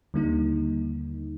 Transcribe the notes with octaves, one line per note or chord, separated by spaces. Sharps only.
D#2 D3 G3 A#3 D#4